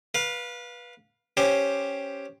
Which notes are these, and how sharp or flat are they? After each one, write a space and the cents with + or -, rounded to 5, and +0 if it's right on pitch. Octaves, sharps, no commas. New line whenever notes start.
B4 -20 F5 +10
C#4 +0 G4 +5 C5 +0